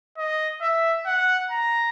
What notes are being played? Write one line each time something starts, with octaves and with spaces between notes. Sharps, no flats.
D#5
E5
F#5
A#5